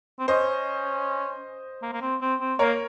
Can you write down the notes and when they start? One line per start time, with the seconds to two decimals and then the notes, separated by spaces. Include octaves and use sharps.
0.19 C4
0.28 C#4 C5 D#5
1.82 A#3
1.93 A#3
2.02 C4
2.21 C4
2.40 C4
2.59 A#3 A#4 C#5